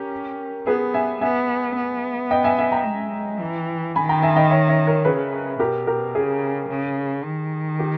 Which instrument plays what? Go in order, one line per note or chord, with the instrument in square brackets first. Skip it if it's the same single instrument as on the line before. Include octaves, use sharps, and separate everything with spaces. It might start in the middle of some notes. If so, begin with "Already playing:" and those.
Already playing: [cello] C#4 [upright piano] G4 A#4
[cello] B3 [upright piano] G#4 B4
[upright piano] E5 G#5
[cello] B3 [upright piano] E5 G#5
[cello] B3
[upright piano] D#5 G5
E5 G#5
E5 G#5
G5 A#5
[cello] G#3
E3
[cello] D#3 [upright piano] G#5 B5
[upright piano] G5 A#5
E5 G#5
D#5 G5
C#5 E5
C#5 E5
A#4 C#5
[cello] C#3 [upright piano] G#4 B4
[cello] B2 [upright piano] G4 A#4
[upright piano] G4 A#4
[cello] C#3 [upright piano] G#4
[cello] C#3
D#3
[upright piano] G4